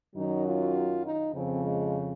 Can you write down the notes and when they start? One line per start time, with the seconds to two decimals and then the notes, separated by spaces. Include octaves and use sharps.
0.15 F#2 D#3 F#3 D#4
0.46 F4
1.05 D#4
1.34 F2 C#3 F3 C4
1.65 G#3